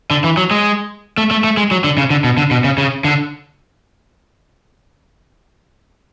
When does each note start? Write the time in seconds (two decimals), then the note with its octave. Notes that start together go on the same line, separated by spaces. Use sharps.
0.11 D3
0.24 E3
0.37 F#3
0.51 G#3
1.18 A3
1.31 A3
1.44 A3
1.57 G#3
1.71 F#3
1.84 D3
1.98 C#3
2.10 D3
2.24 B2
2.37 D3
2.51 B2
2.64 C#3
2.78 C#3
3.04 D3